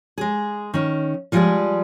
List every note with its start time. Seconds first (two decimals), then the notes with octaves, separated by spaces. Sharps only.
0.18 G#3 G#4
0.74 D#3 C#4
1.32 F3 G3 G#3 E4 G#4 D5